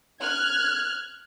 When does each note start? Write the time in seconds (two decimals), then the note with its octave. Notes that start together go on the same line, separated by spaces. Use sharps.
0.21 F6 F#6 G#6